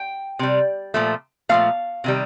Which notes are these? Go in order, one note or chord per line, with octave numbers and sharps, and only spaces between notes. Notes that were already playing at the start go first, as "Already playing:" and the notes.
Already playing: G5
C3 G3
A#2 F3 A3
A#2 F3 A3 F5
C3 D#3 G3